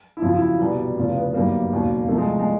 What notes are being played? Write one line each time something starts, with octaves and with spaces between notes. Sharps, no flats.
E4
F2 C#3 F#3 F4
E4
C2 B2 G3
F1 E2 C#3 F4
B3
G1 F#2 D#3 G3 A#3
E1 D#2 C#3 F#3
C2 C3 F3 A3
G#3
G#3